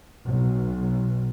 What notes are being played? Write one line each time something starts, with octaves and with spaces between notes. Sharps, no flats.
B1